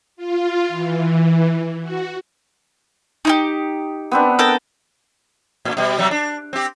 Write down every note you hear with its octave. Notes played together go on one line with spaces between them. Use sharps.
F4
E3
F#4
D#4 E4 G4
B3 C4 D4
A4 A#4 G5
A2
B2 G3
C3 F#3 G3
D4
C4 G4